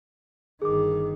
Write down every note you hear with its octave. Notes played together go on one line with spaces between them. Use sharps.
G1 D#3 G#4 D6